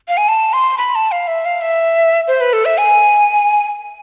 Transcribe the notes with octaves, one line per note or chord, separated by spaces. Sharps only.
F5
G#5
A5
C6
B5
A5
F5
E5
F5
E5
C5
B4
A4
E5
G#5